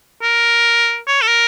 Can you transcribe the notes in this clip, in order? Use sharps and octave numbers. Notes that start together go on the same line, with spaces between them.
A#4
C#5
A4
A#4